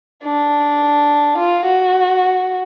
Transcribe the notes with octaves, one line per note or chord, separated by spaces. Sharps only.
D4
F4
F#4